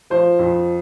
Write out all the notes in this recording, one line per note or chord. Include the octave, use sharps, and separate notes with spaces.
F3 C5
F2